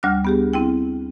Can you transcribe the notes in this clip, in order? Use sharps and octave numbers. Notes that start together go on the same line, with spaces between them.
D2 G3 D4 F6 F#6
B3 G4 G#4
C4 E4 G5